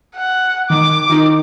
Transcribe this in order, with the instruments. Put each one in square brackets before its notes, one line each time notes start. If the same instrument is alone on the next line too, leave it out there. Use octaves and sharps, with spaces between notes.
[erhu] F#5
[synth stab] D#3 [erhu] D6
[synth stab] D#3 D#4